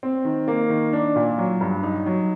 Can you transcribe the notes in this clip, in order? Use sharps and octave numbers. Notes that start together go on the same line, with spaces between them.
C4
D#3
A#3
D#3
D4
A#2
F#3
G2
D#4
F#3